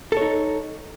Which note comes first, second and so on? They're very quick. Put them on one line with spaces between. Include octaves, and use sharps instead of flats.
A4 C#5 D#4